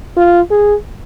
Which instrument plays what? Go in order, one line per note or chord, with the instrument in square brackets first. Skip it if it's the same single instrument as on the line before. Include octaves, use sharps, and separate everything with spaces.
[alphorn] F4
G#4